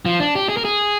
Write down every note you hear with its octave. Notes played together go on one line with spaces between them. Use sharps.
F3
D4
G4
G#4
A#4
G#4